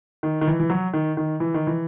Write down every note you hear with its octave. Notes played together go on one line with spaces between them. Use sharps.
D#3
D#3
E3
E3
F#3
D#3
D#3
E3
D#3
E3